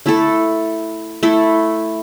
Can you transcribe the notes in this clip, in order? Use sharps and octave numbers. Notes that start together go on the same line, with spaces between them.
A3 E4 A4
A3 E4 A4